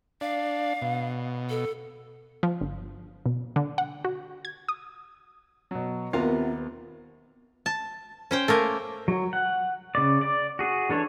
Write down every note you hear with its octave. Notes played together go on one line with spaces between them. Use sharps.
D4 F5
B2
A4
F3
G1
B2
D3
F#5
F#4
G#6
D#6
B2 F#3
D#2 C3 B3 F4 F#4 A#4
A5
C#4 C5 G5
A3 A#3 A#4 G#5
F#3
F#5
C#3 D5
D5
F#4 G#4
E3 D4 A4 C#5